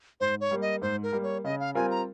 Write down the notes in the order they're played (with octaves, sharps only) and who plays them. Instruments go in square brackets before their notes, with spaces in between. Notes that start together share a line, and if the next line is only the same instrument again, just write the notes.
[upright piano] G#2 [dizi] C5
[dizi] C#5
[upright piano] G3 A#3
[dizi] D#5
[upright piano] G#2 [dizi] C5
[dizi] A#4
[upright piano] G3 A#3
[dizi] C#5
[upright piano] C#3 [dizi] D#5
[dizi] F5
[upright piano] G3 C4 F4 A#4 [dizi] G#5
[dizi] A#5